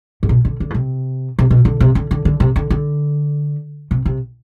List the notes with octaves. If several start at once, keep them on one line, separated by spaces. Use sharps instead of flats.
G#2
B2
D3
D3
B2
C3
C3
B2
D3
C3
D3
D3
D3
C3
D3
D3
C3
C3